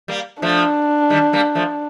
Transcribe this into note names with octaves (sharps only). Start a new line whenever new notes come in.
G3 A#3
F3 A3 D4
D#3 G3
G3 A#3
F3 A3